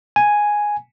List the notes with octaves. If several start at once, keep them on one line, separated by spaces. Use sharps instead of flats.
G#5